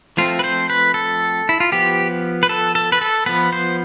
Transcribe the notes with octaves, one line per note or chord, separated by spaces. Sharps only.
F3 A3 C4 F4
B4
C5
B4
A4
E4
F4
F3 B3 G4
B4
A4
A4
B4
A4
F3 B3 B4
C5